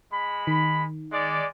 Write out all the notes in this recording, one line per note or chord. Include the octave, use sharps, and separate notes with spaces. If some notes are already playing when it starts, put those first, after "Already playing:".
G#3 B5
D#3
G#3 D5